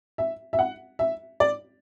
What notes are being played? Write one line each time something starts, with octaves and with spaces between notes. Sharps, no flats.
E5
E5
F#5
E5
D5